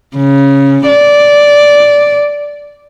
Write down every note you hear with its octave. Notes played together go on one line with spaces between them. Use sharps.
C#3
D5